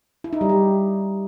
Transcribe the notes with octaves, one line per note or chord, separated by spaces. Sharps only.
E4
D#4
G3
G4